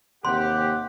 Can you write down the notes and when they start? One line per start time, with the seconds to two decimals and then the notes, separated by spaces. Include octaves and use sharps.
0.25 D#2 C3 G4 F#5 C6